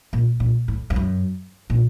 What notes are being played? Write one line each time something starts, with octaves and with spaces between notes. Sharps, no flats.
A#2
A#2
A2
F2
F#2
A#2